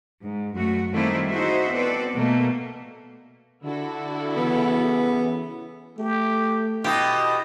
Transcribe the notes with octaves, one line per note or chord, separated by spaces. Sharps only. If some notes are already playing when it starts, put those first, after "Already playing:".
G#2
F#2 A3 F#4
D#3 G3 A3 A#3 C4 E4
D#4 E4 F#4 G#4 C5 E5
B3 C4 F#4 A4 B4 D5
B2 A3 A#3
D3 E4 F#4 A4
C#3 E3 B3
A3 G4
B2 E4 G4 D#5